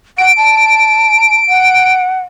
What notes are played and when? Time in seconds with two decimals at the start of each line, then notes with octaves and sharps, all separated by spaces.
0.18 F#5 D7
0.37 A5
1.49 F#5